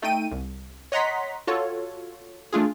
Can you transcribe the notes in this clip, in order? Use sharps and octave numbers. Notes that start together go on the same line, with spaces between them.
A3 D#4 G5 D#7
C2
C#5 D#5 F#5 A#5 C6 B6
F4 F#4 A4 C#5
A3 D4 F4 G#4